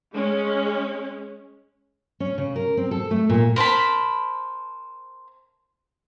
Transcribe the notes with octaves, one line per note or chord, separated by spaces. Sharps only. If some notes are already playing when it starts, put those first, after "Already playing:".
G#3 C#4
C#4
C#3
A#4
C4
A4
A3
A#2
A#4 C5 A5 B5